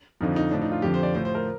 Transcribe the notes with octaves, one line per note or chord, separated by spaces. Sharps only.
F2 D3 F3 D#4
D#4
A2 F3 D4
D#4
F4
F2 D3 F3 G4
C5
D5
A2 F3 C5
C5
A#4